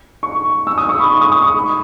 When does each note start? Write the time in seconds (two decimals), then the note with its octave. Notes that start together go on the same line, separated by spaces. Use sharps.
0.23 C#6
0.67 E6
0.78 D#6
0.89 C#6
1.00 B5
1.10 C#6
1.21 D#6
1.32 D#6
1.43 C#6
1.54 B5